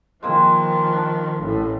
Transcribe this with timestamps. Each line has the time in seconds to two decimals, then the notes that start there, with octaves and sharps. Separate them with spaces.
0.23 D#3 F3 G#3 A#3 C4
0.93 D4
1.40 A1 A2